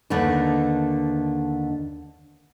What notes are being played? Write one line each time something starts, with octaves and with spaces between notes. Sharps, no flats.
D#2 D3 A3 D#4 B4